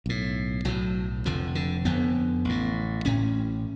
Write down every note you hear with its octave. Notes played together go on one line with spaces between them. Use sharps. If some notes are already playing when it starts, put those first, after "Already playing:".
B1 A2
B1 A2 F#3
F1 F2 D3 F3
D3
F1 F2 D3 B3
A1 A2
A1 A2 C#4